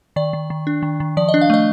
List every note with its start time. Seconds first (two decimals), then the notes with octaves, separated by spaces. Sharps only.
0.16 D#3 D5
0.33 D#3
0.50 D#3
0.67 D4
0.83 D#3
1.00 D#3
1.17 F3 D5
1.29 D#5
1.34 D4
1.41 F5
1.50 A3 D#5